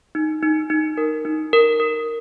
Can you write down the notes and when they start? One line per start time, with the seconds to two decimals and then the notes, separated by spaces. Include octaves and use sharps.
0.15 D#4
0.43 D#4
0.70 D#4
0.98 A#4
1.25 D#4
1.53 A#4
1.80 A#4